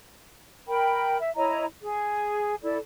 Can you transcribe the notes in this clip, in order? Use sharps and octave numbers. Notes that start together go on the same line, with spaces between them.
A#4 G5 B5
E5
E4 C#5 D#5 A#5
G#4
E4 A4 D5